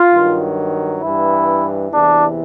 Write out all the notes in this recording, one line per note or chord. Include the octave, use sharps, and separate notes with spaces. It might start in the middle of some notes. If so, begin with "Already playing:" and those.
Already playing: F4
G2 D#3 F#3
G2 E3 E4
E2 C3 E3 D4